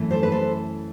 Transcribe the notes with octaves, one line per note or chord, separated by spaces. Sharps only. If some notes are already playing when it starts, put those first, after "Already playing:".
Already playing: F#2 E3 A3
A4 C5
B4
A4 C5